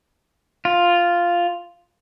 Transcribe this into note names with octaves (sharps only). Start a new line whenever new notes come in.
F4